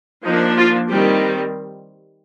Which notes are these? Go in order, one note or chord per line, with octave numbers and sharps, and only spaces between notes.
F3 A#3 D4 D#4
F4
D#3 G3 C4 G4